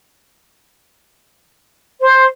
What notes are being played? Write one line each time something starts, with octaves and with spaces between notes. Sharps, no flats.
C5